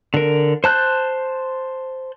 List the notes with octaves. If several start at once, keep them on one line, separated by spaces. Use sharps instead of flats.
D3 A#4
C5 A5 F#6 G6